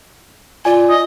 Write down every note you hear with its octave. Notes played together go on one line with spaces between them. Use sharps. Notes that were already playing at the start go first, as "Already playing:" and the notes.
F4 D5 G#5
D#5